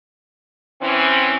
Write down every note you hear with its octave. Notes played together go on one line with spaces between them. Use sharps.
E3 C4 C#4